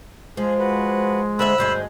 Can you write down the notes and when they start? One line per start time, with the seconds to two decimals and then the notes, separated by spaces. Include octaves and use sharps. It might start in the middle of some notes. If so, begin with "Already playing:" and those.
0.37 F3 G#3 G#4
0.59 F#4 B4
1.39 D3 C5 E5 B5 E6 F#6
1.58 D2 G2 G#3 C5